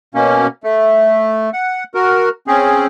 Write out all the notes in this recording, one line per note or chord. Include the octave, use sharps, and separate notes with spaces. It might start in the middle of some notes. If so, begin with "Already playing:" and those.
B2 A#3 C#4
A3
F#5
F#4 A#4
C4 C#4 G#4